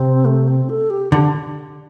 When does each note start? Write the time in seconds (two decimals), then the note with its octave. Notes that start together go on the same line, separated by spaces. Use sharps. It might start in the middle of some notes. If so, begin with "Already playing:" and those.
Already playing: C3 C4
0.25 A3
0.48 C4
0.69 A4
0.90 G4
1.12 D3 G4